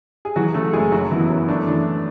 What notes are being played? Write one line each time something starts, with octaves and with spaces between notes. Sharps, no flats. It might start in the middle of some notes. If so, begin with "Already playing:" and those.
G#4
E3 F#3 F#4
C#3 A3 A4
F#1 G#3 G#4
F#2 F#3 F#4
E3 B3 E4
F#2
A3 D4
E3 D4